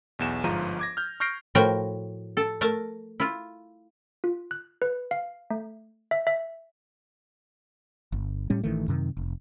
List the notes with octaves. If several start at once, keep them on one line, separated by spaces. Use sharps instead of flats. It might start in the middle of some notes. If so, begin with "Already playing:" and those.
B1 E2 E7
G1 G#2 F3 F4 A#5 D#7
D6 G#6 A#6
F6 G6
C#6 F6 G6 A#6 C7 D7
A2 F3 F#4 A#4 G5
A4
A3 A#4 A5
E4 F4
F4
F#6
B4
F5
A3
E5
E5
G1
A2 G3 C#4
A1 D#3 E3 A3
F#2 C3 D#3
F1